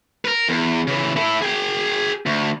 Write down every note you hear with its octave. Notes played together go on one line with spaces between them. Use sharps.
A#4 B4
E2
C#3 E3
E4 A4
G#4 G5
D2